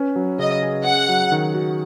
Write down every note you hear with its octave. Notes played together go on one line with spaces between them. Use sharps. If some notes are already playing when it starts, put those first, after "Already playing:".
Already playing: C#4 B4
F#3
C#3 D#5
G#4
C#4 F#5
F#3
D#3
F#4